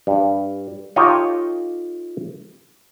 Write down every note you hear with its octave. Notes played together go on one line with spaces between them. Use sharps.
G2
D#4 F4 G4 A4 C#5 D#5